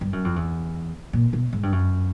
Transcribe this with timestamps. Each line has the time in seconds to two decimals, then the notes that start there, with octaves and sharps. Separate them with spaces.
0.01 G2
0.13 F#2
0.24 F2
0.36 E2
1.13 A#2
1.33 B2
1.53 G#2
1.63 G2
1.72 F#2